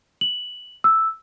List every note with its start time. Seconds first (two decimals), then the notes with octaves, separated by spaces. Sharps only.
0.21 F#7
0.84 E6